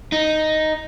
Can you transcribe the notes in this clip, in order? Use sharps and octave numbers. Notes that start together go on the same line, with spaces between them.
D#4